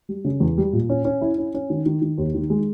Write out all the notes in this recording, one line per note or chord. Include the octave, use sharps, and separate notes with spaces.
G3
C#3
E2
G3
A#2
C#4
C#4
E4
C#4
C#4
D#3
D#3
D#3
D#2
D#3
G#3